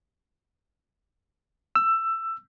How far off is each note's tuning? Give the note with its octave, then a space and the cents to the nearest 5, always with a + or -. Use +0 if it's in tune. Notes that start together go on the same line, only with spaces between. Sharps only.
E6 +15